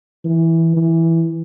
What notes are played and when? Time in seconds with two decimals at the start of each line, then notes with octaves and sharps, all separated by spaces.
0.25 E3
0.77 E3